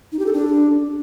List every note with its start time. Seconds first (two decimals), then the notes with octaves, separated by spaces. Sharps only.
0.12 D#4
0.19 G4
0.26 A4
0.33 D4